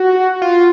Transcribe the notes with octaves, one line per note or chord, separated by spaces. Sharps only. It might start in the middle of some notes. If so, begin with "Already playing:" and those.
Already playing: F#4
F4